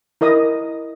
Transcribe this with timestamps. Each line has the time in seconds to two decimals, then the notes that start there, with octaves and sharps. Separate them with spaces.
0.21 E4 A#4 D#5 D#6